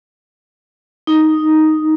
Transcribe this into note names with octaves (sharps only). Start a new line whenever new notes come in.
D#4